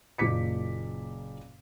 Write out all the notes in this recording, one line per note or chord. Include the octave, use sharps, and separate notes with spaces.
F#1 A#2 D6 B6 C#7